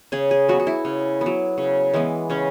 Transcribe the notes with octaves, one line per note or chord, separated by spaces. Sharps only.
C#3 G#4
G#4
F#3 B3 F#4
F#4
E4
C#3
F#3 B3
C#3
E3 G#3 B3
C#3 C#4